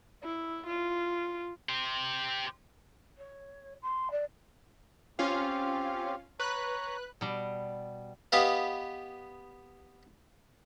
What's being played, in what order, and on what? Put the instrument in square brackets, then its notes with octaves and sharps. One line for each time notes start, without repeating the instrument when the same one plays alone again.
[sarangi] E4
F4
[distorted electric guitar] G4 C5
[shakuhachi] C#5
C6
D5
[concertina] C4 G4 [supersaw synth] C#4 F4 F5
[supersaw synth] B4 F#6 [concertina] C#5 A#5
[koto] B2 G3
[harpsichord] B3 G4 B4 D#5 F5